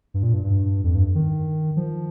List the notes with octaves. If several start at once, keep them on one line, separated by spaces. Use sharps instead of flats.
G2
A#2
G2
G2
F2
G2
D#3
F3